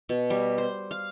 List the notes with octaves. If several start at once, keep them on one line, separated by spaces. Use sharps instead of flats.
B2
G3
C5
F5